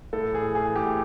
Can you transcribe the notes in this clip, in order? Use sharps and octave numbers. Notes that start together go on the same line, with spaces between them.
A2 A4
E3 G#4
E3 G#4
A2 G4